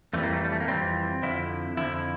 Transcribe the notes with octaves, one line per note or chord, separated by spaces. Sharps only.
F2 E3 G3 A3
A#3
A3
G3
A3
A#3
F2 E3 G3 C4
F2 D3 F3 E4
F2 D3 F3 E4